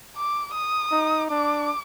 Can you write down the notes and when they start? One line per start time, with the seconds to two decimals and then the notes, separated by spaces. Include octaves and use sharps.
0.16 D6
0.54 D#6
0.91 D#4
1.30 D4 D6